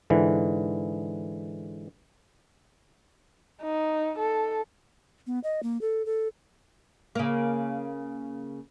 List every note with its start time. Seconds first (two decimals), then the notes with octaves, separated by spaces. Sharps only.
0.10 G#2 D3 E3
3.62 D#4
4.18 A4
5.27 B3
5.44 D#5
5.63 A#3
5.81 A4
6.06 A4
7.15 C#3 A#3